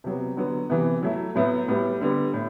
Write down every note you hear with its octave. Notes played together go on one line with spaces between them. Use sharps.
C3 F#3 B3
D3 F#3 B3
C3 E3 B3 E4
F#3 A3 E4
A2 F#3 B3 E4
A2 G3 B3
D3 G3 B3
A2